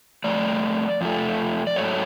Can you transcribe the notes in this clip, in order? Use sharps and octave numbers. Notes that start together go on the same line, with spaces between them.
F2 F3 A3 D5
F2 F3 A3
D5
G#2 F#3 A3 C#5